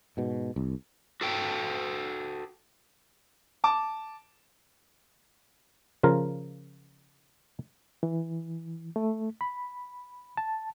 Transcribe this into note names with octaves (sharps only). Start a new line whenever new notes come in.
G#2 B2
C2
F#4 A4 G5
A5 D6
C#3 F3 F4 A#4
E3
A3
B5
A5